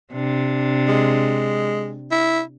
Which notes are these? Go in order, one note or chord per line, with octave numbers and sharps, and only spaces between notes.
C3 D4
G#3
E4